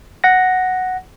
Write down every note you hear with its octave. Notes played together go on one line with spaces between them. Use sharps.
F#5 A#6